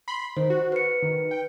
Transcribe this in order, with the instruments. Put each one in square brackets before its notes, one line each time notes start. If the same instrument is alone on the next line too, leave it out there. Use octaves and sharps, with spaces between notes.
[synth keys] B5 C6
[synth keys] D#3 [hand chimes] C5
[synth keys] F#4
[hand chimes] B4 C#7
[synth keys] D#3
G5